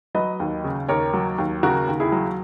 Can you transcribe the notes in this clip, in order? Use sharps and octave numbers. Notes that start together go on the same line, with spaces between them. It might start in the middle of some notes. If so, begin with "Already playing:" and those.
F#3 B4 D#5
D#2
C#3
D#2 A#4 C#5
F#3
D#2
C#3 F#4 A#4
D#2
E4 G#4
F#3